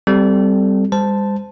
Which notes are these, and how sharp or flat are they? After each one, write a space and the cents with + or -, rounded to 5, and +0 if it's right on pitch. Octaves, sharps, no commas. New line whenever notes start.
G3 +0 C4 -15 A4 +0
G3 +45 C5 -25 A5 +0